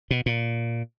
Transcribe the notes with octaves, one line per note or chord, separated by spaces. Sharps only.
B2
A#2